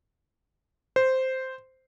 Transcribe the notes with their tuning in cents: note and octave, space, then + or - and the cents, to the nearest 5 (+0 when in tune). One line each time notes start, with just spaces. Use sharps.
C5 -5